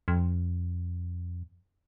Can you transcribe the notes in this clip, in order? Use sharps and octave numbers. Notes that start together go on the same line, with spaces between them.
F2